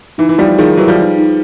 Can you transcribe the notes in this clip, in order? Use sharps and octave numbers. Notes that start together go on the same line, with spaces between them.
E3 D#4
E3
F3 G3 D#4
D#3 F3 G#4
E3 F#3 B4
F3 G3
D#4
D#4